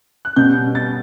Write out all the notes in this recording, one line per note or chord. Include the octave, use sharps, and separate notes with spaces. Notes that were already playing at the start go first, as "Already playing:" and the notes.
F#6
B2 G3 C#4 G6
A6